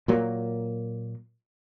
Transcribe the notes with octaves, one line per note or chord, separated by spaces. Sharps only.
A#2 F#3 A#3